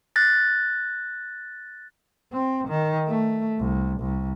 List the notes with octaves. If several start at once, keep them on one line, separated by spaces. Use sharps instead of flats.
F#6 A6 A#6
C4
D#3
A3
C2
C2